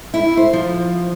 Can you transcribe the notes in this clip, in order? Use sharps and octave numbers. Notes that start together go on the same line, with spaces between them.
E4
C5
F3